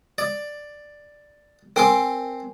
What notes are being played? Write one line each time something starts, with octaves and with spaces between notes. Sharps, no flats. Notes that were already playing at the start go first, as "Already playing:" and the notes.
D5
C4 A#4 G#5 C6 D6